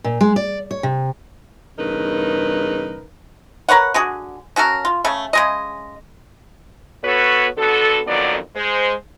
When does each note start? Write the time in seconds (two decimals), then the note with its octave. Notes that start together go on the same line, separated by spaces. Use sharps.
0.04 A#2
0.21 G#3
0.36 D5
0.71 C#5
0.83 C3
1.78 E2 G2 C#3 D#4 A#4 B4
3.69 A#4 B4 C#5 F#5
3.94 D3 F#4 G#4
4.56 C#4 F#4 A4 A#4
4.85 F4
5.04 C#3 A3 A4
5.33 C#3 G#3 D#5
7.03 B3 F#4 A4 B4 C#5
7.57 D3 B3 F#4 A4
8.06 F2 D3 D#3 F#3 B3 D5
8.55 G#3 C5